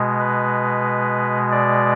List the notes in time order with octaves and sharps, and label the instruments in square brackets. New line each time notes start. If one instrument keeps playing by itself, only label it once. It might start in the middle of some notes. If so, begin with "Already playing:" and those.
Already playing: [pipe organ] B2 G#3
B4
D5